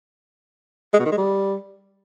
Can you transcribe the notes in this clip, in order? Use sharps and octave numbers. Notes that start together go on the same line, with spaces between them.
G#3
B2
D#3
G#3
G3